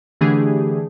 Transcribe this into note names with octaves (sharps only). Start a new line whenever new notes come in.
D3 E3 A3 D4 G4 G#4